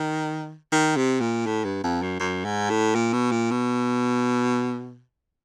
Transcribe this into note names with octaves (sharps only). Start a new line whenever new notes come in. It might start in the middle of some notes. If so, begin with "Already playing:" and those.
Already playing: D#3
D#3
C3
A#2
A2
G2
F2
F#2
F#2
G#2
A2
A#2
B2
A#2
B2